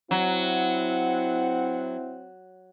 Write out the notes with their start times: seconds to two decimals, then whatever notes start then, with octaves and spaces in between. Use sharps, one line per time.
0.11 F#3 C4 E4 F#5